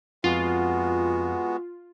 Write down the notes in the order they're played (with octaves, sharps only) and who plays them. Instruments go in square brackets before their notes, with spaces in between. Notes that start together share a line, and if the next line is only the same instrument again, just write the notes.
[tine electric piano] F2 [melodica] G#3 B3 F#4 [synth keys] F4